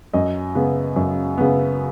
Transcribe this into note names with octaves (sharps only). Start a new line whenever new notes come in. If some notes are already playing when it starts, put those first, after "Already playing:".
F#2 D#5
C#3 B3
F#2
C#3 B3